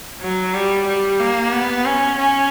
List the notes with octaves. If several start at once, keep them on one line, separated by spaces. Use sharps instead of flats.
F#3
G3
G3
A#3
B3
C#4
C#4